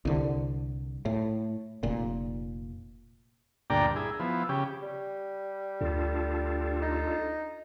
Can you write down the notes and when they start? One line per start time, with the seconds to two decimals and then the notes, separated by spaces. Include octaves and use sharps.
0.05 C2 D3
1.05 A2
1.83 F1 A#2
3.70 D2 G2 A#2 D5 G5 A#5
3.96 E4 G#4
4.20 F3 B3 E4
4.49 C#3 G4
4.83 G3
5.81 D2 D4 F4 A4
6.82 D#4